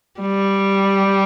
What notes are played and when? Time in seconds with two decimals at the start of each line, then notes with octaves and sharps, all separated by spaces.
0.21 G3